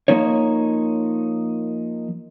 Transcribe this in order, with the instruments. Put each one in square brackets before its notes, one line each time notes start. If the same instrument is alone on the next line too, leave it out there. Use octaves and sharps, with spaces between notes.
[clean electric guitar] F3 A#3 D#4 C#5